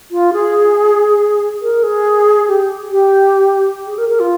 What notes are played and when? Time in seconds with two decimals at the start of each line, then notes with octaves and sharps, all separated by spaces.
0.11 F4
0.33 G#4
1.61 A#4
1.83 G#4
2.48 G4
2.91 G4
3.87 G#4
3.98 A#4
4.09 A#4
4.20 F4